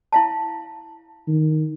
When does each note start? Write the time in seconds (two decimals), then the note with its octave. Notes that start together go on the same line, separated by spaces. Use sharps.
0.12 E4 F5 A5
1.28 D#3